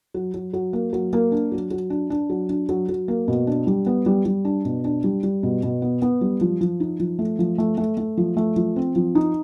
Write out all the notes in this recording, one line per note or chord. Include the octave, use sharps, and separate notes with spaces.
F#3
F#3
F#3
A#3
F#3
A#3
D4
F#3
F#3
D4
D4
F#3
D4
F#3
F#3
A#3
B2
D4
G3
B3
G3
G3
D4
B2
D4
G3
G3
B2
B2
B3
B3
G3
F3
F3
D#4
F3
A3
F3
A3
A3
A3
F3
A3
F3
C4
F3
D#4